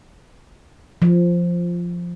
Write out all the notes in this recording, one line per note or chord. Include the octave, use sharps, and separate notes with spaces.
F3